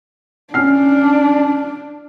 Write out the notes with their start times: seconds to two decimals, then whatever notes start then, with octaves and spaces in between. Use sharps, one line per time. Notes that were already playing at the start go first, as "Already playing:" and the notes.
0.54 C#4 D4 F6 C7